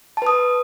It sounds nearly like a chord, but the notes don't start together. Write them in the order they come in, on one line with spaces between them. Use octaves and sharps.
A5 B4 D#6